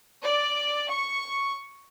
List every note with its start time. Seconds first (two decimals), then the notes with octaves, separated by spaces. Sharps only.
0.24 D5
0.90 C#6